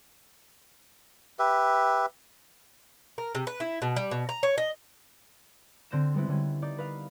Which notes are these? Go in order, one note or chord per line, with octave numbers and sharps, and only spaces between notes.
G4 B4 E5
A#4
C3
B4
E4
B2
G3
B2
A#5
C#5
D#5
D3 C4 G6 A#6 E7
G3 G#3 B3 C4 E4
D3 G3 C#4
D#4 D5 G6
B4 D#5 F5